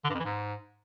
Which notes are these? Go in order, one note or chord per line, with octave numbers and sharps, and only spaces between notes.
D3
G2
F2
E3
G#2